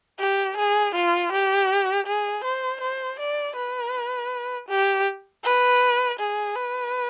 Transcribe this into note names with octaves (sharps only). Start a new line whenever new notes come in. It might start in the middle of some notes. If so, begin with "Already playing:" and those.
G4
G#4
F4
G4
G#4
C5
C5
D5
B4
G4
B4
G#4
B4